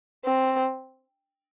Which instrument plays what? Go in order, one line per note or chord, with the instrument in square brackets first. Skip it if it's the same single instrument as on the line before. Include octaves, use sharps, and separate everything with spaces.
[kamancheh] C4